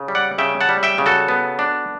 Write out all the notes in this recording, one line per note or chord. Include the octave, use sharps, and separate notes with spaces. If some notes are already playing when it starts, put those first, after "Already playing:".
Already playing: C#3
G3
D5 F#5
C#3 E5 G5
F#5 A5
G3
E5 G5
C#3
F#4 A4
B3
D4